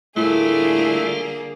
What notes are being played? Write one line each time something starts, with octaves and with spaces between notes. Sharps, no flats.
A2 D3 G3 A3 A#3 F4 G#4